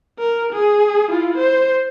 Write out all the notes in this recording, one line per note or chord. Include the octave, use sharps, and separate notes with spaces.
A#4
G#4
E4 F4
C5